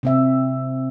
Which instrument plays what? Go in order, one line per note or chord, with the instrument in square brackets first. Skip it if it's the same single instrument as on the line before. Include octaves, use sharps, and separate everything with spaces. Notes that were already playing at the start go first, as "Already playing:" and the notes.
[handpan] C3 C4 E5